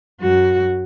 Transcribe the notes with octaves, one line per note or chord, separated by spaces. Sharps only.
F#2 F#4